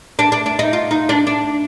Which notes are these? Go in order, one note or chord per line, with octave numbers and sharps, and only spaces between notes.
D4
D4
D4
D#4
F4
D#4
D4
D4